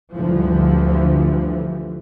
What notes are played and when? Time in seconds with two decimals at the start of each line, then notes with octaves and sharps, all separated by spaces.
0.13 D2 G2 D3 E3 F3